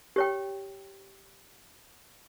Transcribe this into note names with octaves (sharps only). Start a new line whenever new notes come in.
G4 C#5 G5